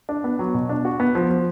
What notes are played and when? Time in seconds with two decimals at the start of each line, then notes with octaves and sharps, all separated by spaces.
0.09 D4
0.24 B3
0.39 F#3
0.54 B2
0.69 D4
0.85 F#4
1.00 B3
1.15 F3
1.30 F3